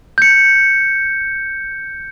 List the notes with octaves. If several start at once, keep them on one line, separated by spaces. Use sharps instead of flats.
G6 C#7